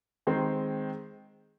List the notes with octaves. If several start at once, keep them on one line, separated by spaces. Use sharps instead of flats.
D#3 G#3 C4